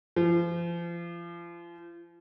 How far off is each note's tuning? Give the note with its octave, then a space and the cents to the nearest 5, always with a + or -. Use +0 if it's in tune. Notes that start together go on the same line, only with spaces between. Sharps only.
F3 -35